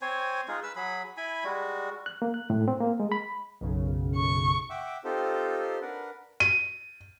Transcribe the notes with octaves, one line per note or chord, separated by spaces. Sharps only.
C4 C5 C#5 G#5
G#3 D#4 F4 G#4
B4 E6
F#3 G#4 B5
E4 G#5 B5
G3 G#3 F#4
F#6
A#3
F#6
A2
C4
A#3
G#3
B5
B1 F#2 C#3
C#6
E5 F#5 G5 D6 E6
C4 D#4 F4 G4 A4 C5
D4 A#4 B4 F#5
D#7